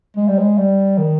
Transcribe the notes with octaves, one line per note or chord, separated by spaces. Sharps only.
G#3
G3
G#3
G3
D#3